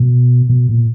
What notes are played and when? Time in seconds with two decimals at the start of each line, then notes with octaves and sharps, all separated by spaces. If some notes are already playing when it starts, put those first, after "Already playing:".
Already playing: B2
0.49 B2
0.69 A#2